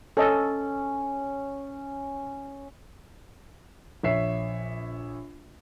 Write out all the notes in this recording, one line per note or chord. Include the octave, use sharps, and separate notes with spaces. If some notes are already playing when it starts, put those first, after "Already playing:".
C#4 A4 D#5
A#1 C#5 E5 C7